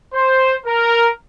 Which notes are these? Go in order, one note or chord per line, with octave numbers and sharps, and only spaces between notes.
C5
A#4